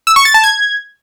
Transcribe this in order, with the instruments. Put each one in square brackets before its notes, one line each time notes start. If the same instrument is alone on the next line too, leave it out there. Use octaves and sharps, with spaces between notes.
[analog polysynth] E6
C#6
A6
A5
G#6